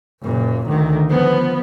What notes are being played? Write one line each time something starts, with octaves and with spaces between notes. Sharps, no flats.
F#1 A#2
D2 D#3
F3 B3